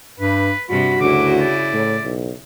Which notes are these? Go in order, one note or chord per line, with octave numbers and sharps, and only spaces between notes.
G2 B4
G2 C3 G3 F#4 B5
D2 C#3 E4 D6
D5
A2
B1